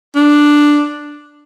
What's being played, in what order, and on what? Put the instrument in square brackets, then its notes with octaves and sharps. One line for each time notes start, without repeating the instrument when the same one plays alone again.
[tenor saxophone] D4